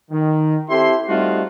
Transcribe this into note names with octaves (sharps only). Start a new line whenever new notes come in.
D#3
C4 E4 G4 A4 C6
G3 A3 C4 D#4 F4 F#4